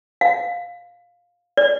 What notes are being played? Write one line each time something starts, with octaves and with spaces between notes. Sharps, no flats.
F5
D5